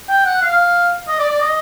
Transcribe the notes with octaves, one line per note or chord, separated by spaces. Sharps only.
G5
F#5
F5
D#5
D5
D5
D#5